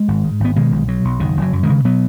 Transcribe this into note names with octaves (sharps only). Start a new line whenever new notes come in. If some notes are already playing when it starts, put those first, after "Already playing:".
Already playing: G#3
G#1
G#2
G#1 B3
B2 D#3 G#3
B1
B2 F#3
B1
F#1 D#3
F#1
F#3
F#2
D#3 G#3
C#3
B2 F#3 B3